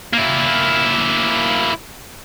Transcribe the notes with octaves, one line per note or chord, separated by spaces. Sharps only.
A#3 E4